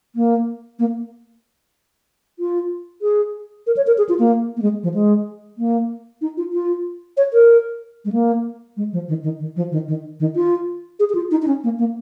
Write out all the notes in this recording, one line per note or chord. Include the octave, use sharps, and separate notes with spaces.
A#3
A#3
F4
G#4
A#4
C#5
A#4
G#4
F4
A#3
A#3
G#3
F3
G#3
A#3
D#4
F4
F4
C#5
A#4
G#3
A#3
G#3
F3
D#3
D#3
D#3
F3
D#3
D#3
D#3
F4
G#4
G#4
F4
D#4
D#4
C#4
A#3
A#3